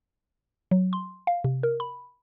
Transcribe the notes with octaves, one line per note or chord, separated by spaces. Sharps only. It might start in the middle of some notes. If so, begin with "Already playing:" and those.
F#3
C6
F5
C3
A#4
B5